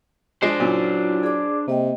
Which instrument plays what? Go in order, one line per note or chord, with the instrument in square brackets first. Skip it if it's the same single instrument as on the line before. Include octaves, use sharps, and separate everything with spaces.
[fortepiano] F3 G#3 [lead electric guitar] D4 C5
[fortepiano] A#2 C#3 [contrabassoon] F#3 [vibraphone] E4 F4
[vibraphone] G#4 D5 D6
[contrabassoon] C3 [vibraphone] A#3 D#5 G5